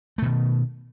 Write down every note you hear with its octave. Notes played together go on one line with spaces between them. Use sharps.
B2 D#3 A3